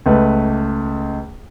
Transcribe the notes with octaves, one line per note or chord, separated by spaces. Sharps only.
C#2 A3 B4